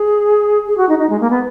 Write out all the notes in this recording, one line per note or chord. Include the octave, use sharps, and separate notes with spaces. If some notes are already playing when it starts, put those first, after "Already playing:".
Already playing: G#4
G#4
F#4
D#4
D#4
G#3
A#3
B3